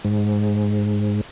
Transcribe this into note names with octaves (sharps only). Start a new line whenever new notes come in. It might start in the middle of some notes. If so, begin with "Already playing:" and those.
G#2